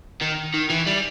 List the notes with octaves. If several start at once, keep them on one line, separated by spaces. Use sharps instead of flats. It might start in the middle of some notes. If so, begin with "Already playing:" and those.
D#3
D#3
E3
G3